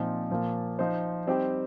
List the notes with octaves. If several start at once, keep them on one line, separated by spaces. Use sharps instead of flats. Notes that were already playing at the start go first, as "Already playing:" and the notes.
Already playing: A#2 F3 C4 D#4
A#2 F3 A#3
F3 D#4 C5
G3 C4 D#4 G4 C5